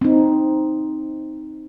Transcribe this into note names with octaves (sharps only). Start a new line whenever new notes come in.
C4 D#4